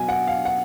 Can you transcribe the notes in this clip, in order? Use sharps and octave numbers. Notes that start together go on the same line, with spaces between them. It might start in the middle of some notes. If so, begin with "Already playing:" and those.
Already playing: B2 F#3 G#5
F#5
F5
F#5